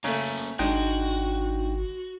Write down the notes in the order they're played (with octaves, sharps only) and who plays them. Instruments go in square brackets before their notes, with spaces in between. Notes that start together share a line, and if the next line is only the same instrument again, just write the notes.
[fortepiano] C#3 A3 [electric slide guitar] A#3 C#4 [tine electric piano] A#5
[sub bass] G#1 [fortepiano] G#3 [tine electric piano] D4 D#4 G5 [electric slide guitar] F#4